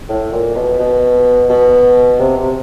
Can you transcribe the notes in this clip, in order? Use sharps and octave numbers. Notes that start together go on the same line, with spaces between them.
A2
A#2
B2
B2
B2
C3
C3